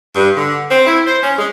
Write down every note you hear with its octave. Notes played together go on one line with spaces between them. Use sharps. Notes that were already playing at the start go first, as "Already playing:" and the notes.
G2
D3
C4
E4
C5
C#4
G#3